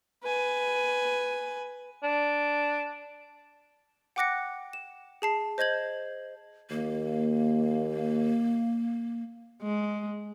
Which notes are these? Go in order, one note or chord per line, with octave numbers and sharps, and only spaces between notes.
B4 G#5
D4
F#5 G5 D6 F#6 A#6 C#7
E7
G#4 A5 C7
C5 D#5 G6 G#6 F#7
D#2 A#3
G#3